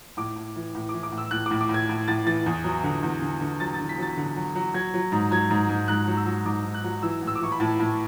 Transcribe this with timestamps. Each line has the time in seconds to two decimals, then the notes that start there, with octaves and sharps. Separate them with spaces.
0.17 A2 D6
0.36 A2
0.56 E3
0.75 A2
0.89 D6
0.94 E3
1.03 D6
1.12 A2
1.18 E6
1.31 A2 F#6
1.46 D6
1.51 A2
1.61 D6
1.69 A2
1.74 G#6
1.89 A2
2.08 A2 A6
2.26 E3 A6
2.46 E2
2.64 F#3
2.83 D3
3.03 E2
3.22 D3
3.41 D3
3.60 F#3 A6
3.74 A6
3.79 D3
3.89 B6
3.98 F#3 A6
4.17 D3
4.36 F#3
4.55 F#3
4.74 F#3 G#6
4.94 F#3
5.12 G#2
5.31 F#3 G#6
5.50 G#2
5.69 G#2
5.88 G#2 F#6
6.08 F#3
6.17 E6
6.26 F#3
6.45 G#2 D6
6.65 G#2
6.74 F#6
6.84 F#3
7.02 E3 E6
7.22 A2 E6
7.35 D6
7.41 E3 C#6
7.52 B5
7.60 A2 A5
7.80 A2